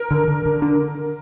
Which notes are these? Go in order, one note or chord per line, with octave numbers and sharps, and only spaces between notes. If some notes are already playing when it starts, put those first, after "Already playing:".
Already playing: A#4
D3
D3
D3
D4